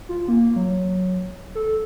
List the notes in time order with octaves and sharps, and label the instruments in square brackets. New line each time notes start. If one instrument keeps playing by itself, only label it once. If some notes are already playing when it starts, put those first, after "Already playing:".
[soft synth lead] F4
A#3
F#3
A4